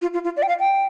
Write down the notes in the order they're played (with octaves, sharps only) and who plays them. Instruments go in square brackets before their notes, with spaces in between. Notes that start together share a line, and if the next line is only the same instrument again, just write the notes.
[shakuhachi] F4
F4
F4
D5
G5
F5
G5